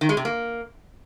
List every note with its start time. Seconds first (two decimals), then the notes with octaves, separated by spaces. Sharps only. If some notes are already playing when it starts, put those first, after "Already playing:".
0.01 D#3
0.09 G#3
0.17 C3
0.25 A#3